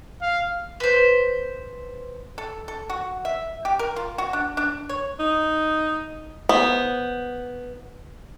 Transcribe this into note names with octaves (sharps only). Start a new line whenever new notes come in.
F5
B4 C5
A4
A4
F#4
E5
G4
A#4
F4
F#4
D4
D4
C#5
D#4
B3 C5